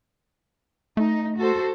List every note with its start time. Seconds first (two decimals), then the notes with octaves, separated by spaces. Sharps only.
0.97 A3 D#4
1.38 F#4 A4 C5